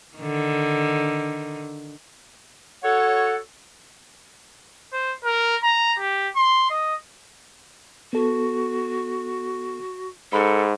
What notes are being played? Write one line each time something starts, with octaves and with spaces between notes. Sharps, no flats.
D3 D#3
F#4 A4 C#5 F#5
C5
A#4
A#5
G4
C6
D#5
B3 F#4 A4
G#2 A4 B5